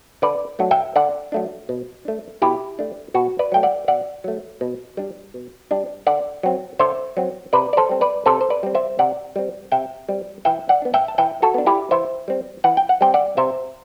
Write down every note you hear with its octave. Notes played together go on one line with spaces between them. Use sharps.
D3 B4 D5
F#3 A3 D4
E5 G5
D3 D5 F#5
F#3 A3 D4
B2
A3 D4
B2 E4 G4
A3 D4
B2 F#4
B4 D5
F#3 A3 G5
D5 F#5
B2 D5 F#5
F#3 A3
B2
G3 D4
B2
G3 D4
D3 D5 F#5
F#3 C4
D3 C5 E5
F#3 C4
C3 B4 D5
D5
A4 C5
G3 C4
B4 D5
C3 A4 C5
C5
B4 D5
G3 C4
C5 E5
C3 D5 F#5
G3 C4
C3 E5 G5
G3 C4
E3 E5 G5
D5 F#5
B3 D4
E5 G5
A5
E3 E5 G5
F#4 A4
B3 D4
E4 G4
E3 C5 E5
G3 C4
E3 F#5
G5
F#5
G3 C4 G5
D5 F#5
C3 C5 E5